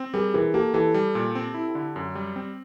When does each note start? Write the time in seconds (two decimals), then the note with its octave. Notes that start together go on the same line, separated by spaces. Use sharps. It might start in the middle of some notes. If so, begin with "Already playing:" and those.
Already playing: C4
0.14 G3 G#4 A#4
0.34 E3 G#4 A#4
0.54 A#3 G4 A4
0.74 E3 G4 A4
0.94 G3
1.15 A#2
1.35 C4
1.54 E4
1.75 D3
1.96 F#2
2.15 G3
2.36 C4